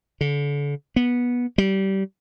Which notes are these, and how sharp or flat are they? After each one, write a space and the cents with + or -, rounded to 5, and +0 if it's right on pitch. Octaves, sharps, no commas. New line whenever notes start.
D3 -35
B3 -15
G3 -20